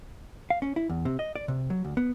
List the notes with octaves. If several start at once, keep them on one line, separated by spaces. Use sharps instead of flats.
F5
C#4
E4
E2
C3
D#5
D5
C3
F#3
D2
B3